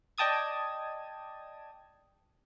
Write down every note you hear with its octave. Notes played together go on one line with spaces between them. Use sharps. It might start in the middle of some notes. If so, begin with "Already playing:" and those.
D5 D#5 G5 A5 D#6 G#6